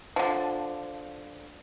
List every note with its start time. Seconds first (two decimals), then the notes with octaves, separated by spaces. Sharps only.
0.16 D3 F3